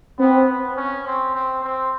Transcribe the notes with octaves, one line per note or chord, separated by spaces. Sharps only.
B3 C4
B3
C#4
C4
C4
C4